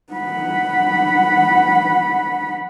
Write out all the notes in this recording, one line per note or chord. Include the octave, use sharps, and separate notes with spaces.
F#5 B5